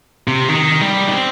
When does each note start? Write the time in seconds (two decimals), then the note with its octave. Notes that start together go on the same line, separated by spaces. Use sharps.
0.28 C3
0.49 D#3
0.81 G3
1.07 D#4
1.13 C4